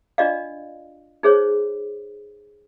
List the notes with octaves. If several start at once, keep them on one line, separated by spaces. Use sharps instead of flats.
D4 F4 D5 D#5 F5
D#4 G#4 C5 C#5